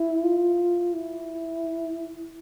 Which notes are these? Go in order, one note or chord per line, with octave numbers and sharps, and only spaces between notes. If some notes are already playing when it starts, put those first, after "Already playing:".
Already playing: E4
F4
E4